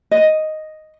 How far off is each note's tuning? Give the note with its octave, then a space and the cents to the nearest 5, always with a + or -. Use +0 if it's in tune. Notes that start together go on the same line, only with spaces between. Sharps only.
D#5 +0